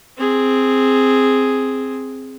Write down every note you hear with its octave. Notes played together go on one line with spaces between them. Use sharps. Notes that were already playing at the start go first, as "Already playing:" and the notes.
C4 G#4